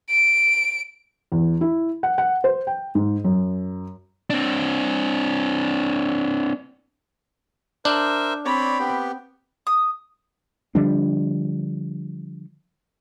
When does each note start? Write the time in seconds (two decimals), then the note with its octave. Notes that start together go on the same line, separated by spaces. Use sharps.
0.10 D7
1.32 E2
1.61 E4
2.03 F#5
2.18 F#5
2.44 C5
2.67 G5
2.95 G#2
3.24 F#2
4.30 C4 D4
7.85 D4 A#4 C5 E5
8.45 C4 C#5 D5 B5
8.80 B3 G4
9.67 D#6
10.75 D3 F3 G3 D4